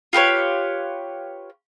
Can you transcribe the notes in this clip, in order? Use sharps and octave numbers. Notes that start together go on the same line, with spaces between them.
F4 G4 B4 C#5